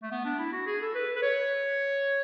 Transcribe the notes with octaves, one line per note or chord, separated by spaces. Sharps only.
A3
B3
D4
E4
F#4
G#4
A4
B4
B4
C#5